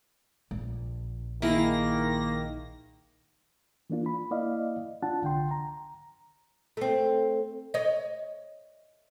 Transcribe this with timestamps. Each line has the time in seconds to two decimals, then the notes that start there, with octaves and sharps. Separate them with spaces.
0.51 A#1
1.42 D#3 A#3 E4 G#4 A#6
3.90 E3 A#3 D4 F4
4.06 B5
4.31 A#3 E4 D5 D#5 F5
5.02 D4 F4 F#5 A5
5.22 C2 D3 G5 C6
5.51 A#5
6.77 A3 C4
7.74 C#5 D#5